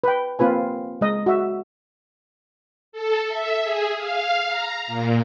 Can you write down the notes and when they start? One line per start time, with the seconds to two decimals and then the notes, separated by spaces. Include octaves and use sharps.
0.04 B4 G5
0.39 A#3 C4 F4 B4 G#5
1.01 G#3 D#5
1.26 F#4 E5
2.92 A4
3.28 E5
3.63 G#4
3.96 F5
4.49 A#5
4.87 A#2